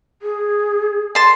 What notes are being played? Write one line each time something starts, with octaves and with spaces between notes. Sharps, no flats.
G#4
A5 C6